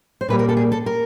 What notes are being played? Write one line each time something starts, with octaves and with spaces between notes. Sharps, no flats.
C5
A#2 G3 A#3 B4
A#4
A4
G#4
A4
A#4